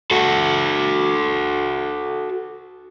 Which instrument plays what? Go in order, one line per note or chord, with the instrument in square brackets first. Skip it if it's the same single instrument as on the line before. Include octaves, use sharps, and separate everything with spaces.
[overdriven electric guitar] F#4 A4